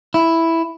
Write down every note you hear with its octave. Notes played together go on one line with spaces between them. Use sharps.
E4